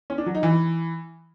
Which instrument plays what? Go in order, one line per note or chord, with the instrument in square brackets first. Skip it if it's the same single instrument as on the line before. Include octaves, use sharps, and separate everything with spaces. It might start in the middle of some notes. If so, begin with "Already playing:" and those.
[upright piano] C#4
D4
F#3
D#4
E3